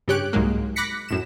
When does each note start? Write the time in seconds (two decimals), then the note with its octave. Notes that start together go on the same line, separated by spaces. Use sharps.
0.08 G2 C#3 G4 C#5 F#6 D7
0.33 C2 G#2 F#3 G#3 A#3
0.76 B5 D6 F#6 A#6 B6 C#7
1.08 F#2 A2 E7